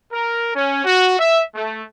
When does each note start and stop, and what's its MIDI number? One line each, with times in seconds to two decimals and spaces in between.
0.12 0.52 70
0.54 0.84 61
0.85 1.16 66
1.19 1.41 76
1.55 1.82 57